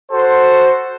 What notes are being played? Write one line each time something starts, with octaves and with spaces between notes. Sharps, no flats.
F#4 A4 C5